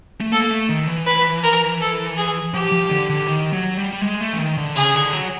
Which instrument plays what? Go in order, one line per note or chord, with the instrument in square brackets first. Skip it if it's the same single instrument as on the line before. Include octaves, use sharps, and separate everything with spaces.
[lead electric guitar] A3
[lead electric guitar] A#3 [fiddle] A4
[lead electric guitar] A3
D#3
E3
[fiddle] B4
A#4
A4
G#4
[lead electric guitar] F3 [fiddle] G4
[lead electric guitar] F3
D3
D3
D#3
F#3
G3
G3
G#3
A3
E3
D#3
D3
[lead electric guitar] C#3 [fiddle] G#4
[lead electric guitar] D3
F#3